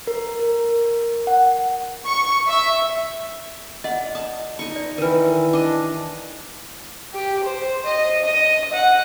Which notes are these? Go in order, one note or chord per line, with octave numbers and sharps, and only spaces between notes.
A#4
A#4
F#5
C#6
E5
D5 D#5 F#5
A5 D#6
D#4 C#6
D5
D#3 E3 A#4 B4
D4 D#5 D6
G4
C5
D#5
D#5
F#5